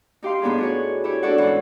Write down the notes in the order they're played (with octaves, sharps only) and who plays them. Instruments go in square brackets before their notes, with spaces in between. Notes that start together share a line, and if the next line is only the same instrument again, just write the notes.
[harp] D#4 G4 F5 C6
A2 B3 D4 D#4 G#4
D4 F#4 C#5
E4 G4 C#5
D4 F#4 A4 C#5 D5 F#5
G#2 E3 C#4 F#5